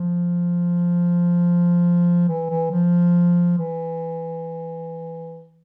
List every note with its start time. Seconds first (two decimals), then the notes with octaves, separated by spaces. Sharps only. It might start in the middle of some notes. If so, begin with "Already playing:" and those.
Already playing: F3
2.28 E3
2.50 E3
2.71 F3
3.58 E3